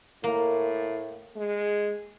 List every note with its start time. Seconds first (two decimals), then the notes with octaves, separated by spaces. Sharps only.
0.24 A2 A#3
1.36 G#3